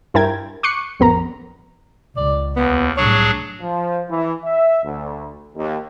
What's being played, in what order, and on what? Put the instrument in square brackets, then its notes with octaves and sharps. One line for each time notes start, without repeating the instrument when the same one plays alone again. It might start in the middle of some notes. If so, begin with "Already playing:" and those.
[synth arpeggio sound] G2 E4 A#4 G5 G#6
C#6 D6 F#6 C7 C#7
A1 F2 B3 A#4 A#5
[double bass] C#2 [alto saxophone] D5
[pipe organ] D#2 [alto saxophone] B3
[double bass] C2 A2 [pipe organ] F#3 D4 G#4 [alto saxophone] C#5
[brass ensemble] F3
E3
E5
D2
D#2